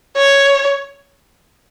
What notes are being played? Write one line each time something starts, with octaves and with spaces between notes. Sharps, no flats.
C#5